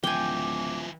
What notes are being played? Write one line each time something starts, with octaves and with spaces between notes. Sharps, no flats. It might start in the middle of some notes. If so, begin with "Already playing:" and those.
D1 F3 E4 G5 G#5 D6